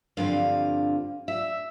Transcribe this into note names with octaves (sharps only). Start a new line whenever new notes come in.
G2 D3 F3 C4 F5
E5